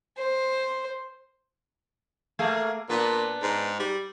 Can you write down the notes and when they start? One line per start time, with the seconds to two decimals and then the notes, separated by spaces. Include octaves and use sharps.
0.18 C5
2.39 A3 A#3 G#4
2.89 A#2 B3 D4 B4
3.42 G#2
3.79 G3